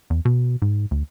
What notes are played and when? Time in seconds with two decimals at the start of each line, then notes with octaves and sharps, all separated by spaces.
0.10 E2
0.25 B2
0.62 G#2
0.91 D2